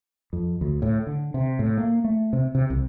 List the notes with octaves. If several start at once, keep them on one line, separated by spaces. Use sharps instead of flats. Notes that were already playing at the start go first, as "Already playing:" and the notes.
F2
D2
A2
D3
C3
A2
A#3
A3
C3
C3
C2